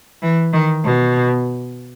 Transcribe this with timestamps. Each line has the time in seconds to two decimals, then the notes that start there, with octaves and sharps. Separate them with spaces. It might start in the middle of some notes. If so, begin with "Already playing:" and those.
0.22 E3
0.53 D#3
0.84 B2